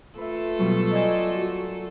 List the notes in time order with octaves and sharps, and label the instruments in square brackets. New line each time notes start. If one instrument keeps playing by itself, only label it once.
[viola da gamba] A3 F4 A4 [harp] B4 E5
[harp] B2 F#3 G3
[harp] A#4 D5 G#5 [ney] D#5
[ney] F#4